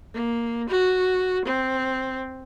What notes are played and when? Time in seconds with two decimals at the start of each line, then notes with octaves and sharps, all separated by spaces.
0.14 A#3
0.69 F#4
1.45 C4